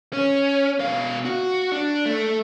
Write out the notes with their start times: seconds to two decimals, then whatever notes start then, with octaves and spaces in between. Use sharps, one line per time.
0.13 C#4
0.80 B2 F5
1.25 F#4
1.72 D4
2.06 A3